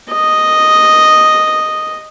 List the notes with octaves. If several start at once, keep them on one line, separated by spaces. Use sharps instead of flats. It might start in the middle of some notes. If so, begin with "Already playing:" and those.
D#5